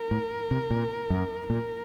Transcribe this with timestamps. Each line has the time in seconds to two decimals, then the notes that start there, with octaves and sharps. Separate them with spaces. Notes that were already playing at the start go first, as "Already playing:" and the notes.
Already playing: A#4
0.11 A2
0.51 C3
0.71 A#2
1.10 F#2
1.49 A#2 A#4